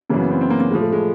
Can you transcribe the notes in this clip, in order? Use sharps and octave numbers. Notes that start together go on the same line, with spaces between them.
F#2 C#3 E3 A#3
B3
C4
C4
A#3
A#3
A2 F3 G#3
A3
G#3